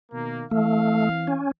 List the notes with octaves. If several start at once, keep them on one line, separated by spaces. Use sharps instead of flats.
B2 D#3 A#3
E3 A3 C4 F5
C#4